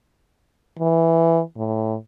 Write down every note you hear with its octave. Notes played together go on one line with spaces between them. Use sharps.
E3
A2